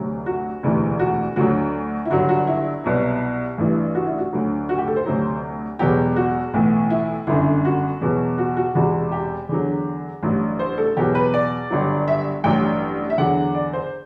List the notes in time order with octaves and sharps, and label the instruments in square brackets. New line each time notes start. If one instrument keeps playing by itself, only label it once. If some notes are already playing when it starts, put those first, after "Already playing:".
Already playing: [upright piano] D2 C3 F#3
F#4
E1 D2 C3 E3
F#4
D2 D3 F#3 F#4
E4
G1 G2 F#3 F#4
F#4
E4
C2 B2 F#3
A1 G2 E3
F#4
E4
F#4
D2 D3 F#3
F#4
G4
A4
C5
D2 C3 F#3
E1 E2 B2 F#3 G4
F#4
B1 A2 E3
E4
G1 F#2 D3 E4
F#4
E2 B2 F#3
F#4
F#4
E1 E2 C3 F#4
G4
E2 D3 F#3
A1 G2 F#3
C5
A4
E2 B2 F#3 G4
B4
D5
G1 G2 F#3
E5
A1 G2 F#3 G5
E5
E2 D3 F#3 F#5
D5
C5